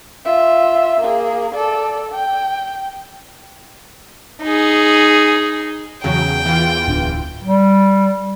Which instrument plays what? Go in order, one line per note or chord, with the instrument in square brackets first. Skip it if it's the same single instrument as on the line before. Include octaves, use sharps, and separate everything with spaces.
[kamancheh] F4 E5
A#3 G#4
A4 D5
G5
[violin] D#4 G#4
[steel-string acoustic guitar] E2 B3 G#4 [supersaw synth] C#3 F#3 [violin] G5
[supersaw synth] E3 F4
[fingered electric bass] D1 D4
[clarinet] G3